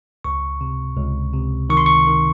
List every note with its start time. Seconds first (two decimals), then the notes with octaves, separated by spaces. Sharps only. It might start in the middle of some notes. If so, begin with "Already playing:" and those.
0.24 C#2 C#6
0.61 C3
0.97 C#2
1.33 C3
1.70 D#3 C#6
1.77 C6
1.86 C#6
2.07 D#3